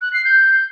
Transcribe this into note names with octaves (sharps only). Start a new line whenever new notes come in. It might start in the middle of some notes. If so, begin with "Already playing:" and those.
F#6
C7
G6